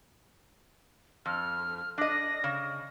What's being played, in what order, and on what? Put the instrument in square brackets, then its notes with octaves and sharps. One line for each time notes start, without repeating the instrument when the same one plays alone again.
[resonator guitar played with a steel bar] F2 [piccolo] F6
[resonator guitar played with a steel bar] D4 D#5 [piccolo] A#6
[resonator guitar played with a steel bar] C#3